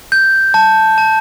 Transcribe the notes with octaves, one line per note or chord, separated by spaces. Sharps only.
G6
A5
A5